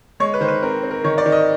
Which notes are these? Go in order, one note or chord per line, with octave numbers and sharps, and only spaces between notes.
G#3 C#5
B4
D#3 C5
B4
C4 A#4
C4
A#4
D#3 C#5
D5
D#3
D#5